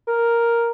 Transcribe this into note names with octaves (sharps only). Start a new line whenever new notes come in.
A#4